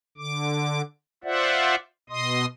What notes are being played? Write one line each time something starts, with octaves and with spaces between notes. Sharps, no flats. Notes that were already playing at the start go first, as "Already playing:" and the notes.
D3 D6
F4 C5 D5 E5 F#5
B2 D#5 C6 D#6